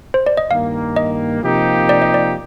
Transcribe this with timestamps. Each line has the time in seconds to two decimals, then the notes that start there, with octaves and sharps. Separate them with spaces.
0.14 C5
0.26 D5
0.37 D#5
0.50 G2 D#3 A#3 F5
0.96 D#5
1.43 C3 F3 A#3 D#4 G4
1.89 D5
2.02 D#5
2.14 D5